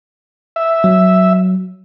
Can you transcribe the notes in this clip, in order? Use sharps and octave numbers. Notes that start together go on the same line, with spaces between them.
E5
F#3